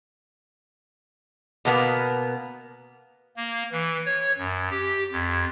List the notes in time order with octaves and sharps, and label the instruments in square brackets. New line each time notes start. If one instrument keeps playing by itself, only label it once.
[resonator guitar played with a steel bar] B2 A#3 B3
[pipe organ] A#3
E3
C#5
F#2
G4
F2